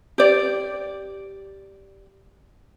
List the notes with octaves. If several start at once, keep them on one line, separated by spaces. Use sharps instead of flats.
G4 D5